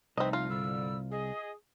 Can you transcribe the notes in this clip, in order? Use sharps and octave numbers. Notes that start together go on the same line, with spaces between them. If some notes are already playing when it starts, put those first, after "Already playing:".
C2 F3 A3 C4 D#4 B4 D#5
F4 F5
G#2 D3 G3 E6
G#4 D#5